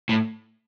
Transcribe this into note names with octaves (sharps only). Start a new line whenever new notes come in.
A2